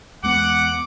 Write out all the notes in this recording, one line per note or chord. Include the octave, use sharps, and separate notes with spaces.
E2 G#3 B3 F#5 D6